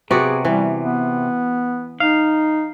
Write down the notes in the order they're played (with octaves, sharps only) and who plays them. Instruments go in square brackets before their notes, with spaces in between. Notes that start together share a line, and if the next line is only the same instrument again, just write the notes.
[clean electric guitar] C3 [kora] B3 F#4 D5 [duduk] G#4
[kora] E3 [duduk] G3
[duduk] B3
[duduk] D#4 [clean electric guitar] F5